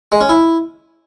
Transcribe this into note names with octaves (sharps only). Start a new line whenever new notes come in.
G#3
C#4
E4